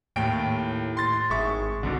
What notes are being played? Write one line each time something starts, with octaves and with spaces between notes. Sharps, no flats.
D#2 A2 G5 D7
C6 A6
G#1 G#3 E5 C#6
C2 G#2 B2 D3